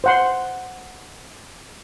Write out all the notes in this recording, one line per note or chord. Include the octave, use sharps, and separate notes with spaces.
C5 F#5 C6